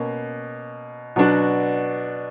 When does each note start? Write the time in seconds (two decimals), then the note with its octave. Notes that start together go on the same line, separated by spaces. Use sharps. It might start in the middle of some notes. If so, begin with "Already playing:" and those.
Already playing: B2 A#3 C#4
1.16 B2 F#3 B3 D4 F#4